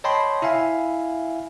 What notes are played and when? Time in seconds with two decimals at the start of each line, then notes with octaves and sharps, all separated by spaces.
0.04 C#5 D#5 G5 A5 B5 C6
0.42 E4 E5 F5 G#5